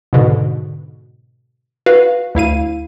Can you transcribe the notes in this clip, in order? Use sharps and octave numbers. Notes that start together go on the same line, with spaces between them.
G#2 B2 D3
F#4 B4 F5
D2 E4 F5 D#7